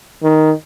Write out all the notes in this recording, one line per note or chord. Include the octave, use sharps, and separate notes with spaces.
D#3